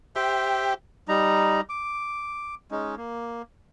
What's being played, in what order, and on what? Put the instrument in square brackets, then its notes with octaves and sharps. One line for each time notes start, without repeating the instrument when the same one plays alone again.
[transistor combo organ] G4 [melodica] C5 E5 G5
[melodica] G3 D#4 A#5
D6
G#3 C#4 D#4
A#3